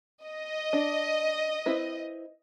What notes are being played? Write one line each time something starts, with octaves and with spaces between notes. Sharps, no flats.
D#5
D4
C4 E4 B4